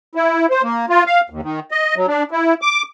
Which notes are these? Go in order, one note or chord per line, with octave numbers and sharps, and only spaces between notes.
E4
C5
A#3
F4
F5
D#2
D#3
D#5
F#3
D4
E4
D6